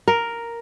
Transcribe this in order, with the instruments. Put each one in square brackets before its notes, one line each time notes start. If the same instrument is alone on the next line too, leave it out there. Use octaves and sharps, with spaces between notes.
[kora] A#4